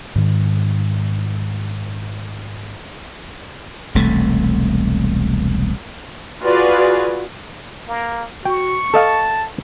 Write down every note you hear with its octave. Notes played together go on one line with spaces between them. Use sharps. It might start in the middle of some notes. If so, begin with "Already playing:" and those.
G#2 D#3
E1 C2 C3 A3
F4 F#4 G#4 B4 D5
A#3
F#4 G5 C#6
A4 D#5 F5 A5